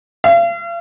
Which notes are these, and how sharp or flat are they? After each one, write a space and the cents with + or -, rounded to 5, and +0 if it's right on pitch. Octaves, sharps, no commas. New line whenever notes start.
F5 -40